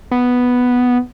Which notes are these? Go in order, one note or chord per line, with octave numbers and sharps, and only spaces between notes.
B3